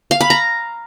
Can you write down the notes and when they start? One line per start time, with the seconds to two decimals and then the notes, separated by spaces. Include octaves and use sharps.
0.11 F5
0.21 B5
0.30 A#5